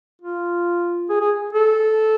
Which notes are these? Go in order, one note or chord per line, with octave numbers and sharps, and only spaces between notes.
F4
G#4
G#4
A4